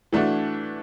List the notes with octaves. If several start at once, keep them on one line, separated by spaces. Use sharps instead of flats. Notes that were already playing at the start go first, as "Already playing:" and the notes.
E3 A3 D4 F#4